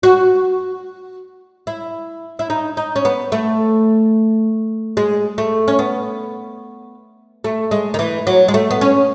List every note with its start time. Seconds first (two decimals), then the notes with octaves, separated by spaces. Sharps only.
0.03 F#4
1.67 E4
2.39 E4
2.50 D#4
2.77 D#4
2.96 C#4
3.05 B3
3.32 A3
4.97 G#3
5.38 A3
5.68 C#4
5.79 B3
7.44 A3
7.71 G#3
7.94 D#3
7.99 E3
8.27 F#3
8.48 G#3
8.54 A3
8.71 B3
8.81 C#4